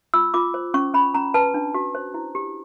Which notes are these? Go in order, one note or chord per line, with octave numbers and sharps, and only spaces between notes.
F4 E6
F4 D6
C5
C#4 C#6
C#4 B5
C#4 A#5
B4 A5
D4
F#4
C5
E4
G4